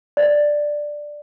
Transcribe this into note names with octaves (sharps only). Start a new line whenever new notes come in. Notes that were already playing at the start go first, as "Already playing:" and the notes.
D5